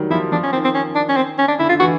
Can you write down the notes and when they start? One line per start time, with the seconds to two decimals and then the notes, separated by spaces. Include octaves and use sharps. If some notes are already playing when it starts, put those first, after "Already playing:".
Already playing: D#3 F#3 G3
0.10 F3 E4
0.32 F3 D4
0.43 C#4
0.53 D#3 C4
0.64 C4
0.74 C#4
0.95 D4
1.09 C#4
1.16 C4
1.39 C#4
1.48 D4
1.59 D3 E4
1.69 D3 F4
1.80 E3 F#4